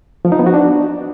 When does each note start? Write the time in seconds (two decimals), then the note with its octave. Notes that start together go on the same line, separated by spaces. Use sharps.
0.25 F3
0.32 D#4
0.39 B3
0.46 F#4
0.54 D4